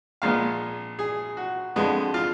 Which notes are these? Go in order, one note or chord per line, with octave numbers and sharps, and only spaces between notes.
A#1 A#2 G#3 B3 F5
G#4
F#4
F2 D3 G#3 B3
F4